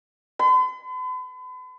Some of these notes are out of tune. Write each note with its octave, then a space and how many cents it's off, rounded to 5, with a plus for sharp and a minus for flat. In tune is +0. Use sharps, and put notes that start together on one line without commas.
B5 +45